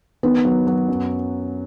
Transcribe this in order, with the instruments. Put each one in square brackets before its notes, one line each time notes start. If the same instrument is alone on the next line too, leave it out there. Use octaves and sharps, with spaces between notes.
[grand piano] D#3 [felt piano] B3
[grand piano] F#3
F#3
F#2